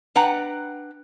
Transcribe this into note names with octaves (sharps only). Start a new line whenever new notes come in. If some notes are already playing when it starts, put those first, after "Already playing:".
D4 B4 F#5 G5 A#5